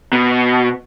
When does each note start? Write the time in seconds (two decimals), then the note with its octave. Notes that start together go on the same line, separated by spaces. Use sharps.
0.13 B2